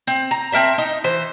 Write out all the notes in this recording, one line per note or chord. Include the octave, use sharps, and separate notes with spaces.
C4
A#5
C4 A#4 E5 A5
D#4
E3 C5